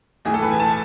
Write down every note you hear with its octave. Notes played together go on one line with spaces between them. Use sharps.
B1 A2 E3 G#4
A4
B4
G#5
A5